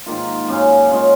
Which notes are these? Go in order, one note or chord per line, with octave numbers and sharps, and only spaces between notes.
G#2 D#3 A#3 F4
F#2 C#3 F#3 C#4
C#3 G#3 C#4 F4